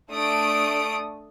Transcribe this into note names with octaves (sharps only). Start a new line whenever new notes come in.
A3 D4 D#6 D7